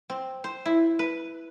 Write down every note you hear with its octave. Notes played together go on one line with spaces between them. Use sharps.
C4
C5
E4
B4